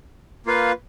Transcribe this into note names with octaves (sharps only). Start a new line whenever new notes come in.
A#3 F4 B4 F5